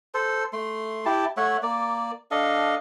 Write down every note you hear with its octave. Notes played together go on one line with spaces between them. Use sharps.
A4 C5
A3 C6
E4 G4 A5
A3 C#5 E5 F#5
A#3 D5
D4 A4 D#5 F5